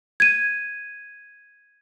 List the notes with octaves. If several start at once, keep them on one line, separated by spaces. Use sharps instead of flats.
G#6 D#7